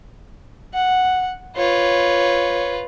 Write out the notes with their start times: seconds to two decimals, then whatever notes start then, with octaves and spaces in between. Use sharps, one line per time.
0.74 F#5
1.57 F4 B4 C#5